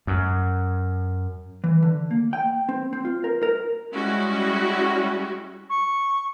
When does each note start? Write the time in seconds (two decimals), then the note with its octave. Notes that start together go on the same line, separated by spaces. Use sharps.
0.07 F#2
1.64 E3
1.83 D3
2.11 A#3
2.33 G5
2.69 C4
2.93 C4
3.05 F4
3.24 A#4
3.43 A#4
3.93 G3 G#3 C#4 E4 F#4
5.70 C#6